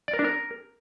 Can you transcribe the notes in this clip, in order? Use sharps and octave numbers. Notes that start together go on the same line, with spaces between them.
D5
A#4
D4
A#4